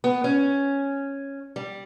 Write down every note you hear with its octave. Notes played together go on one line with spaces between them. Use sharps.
B3
C#4
G3